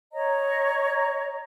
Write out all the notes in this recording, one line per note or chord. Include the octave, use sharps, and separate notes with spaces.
C#5 D#5 A#5